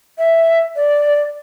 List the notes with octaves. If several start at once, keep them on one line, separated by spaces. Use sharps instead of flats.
E5
D5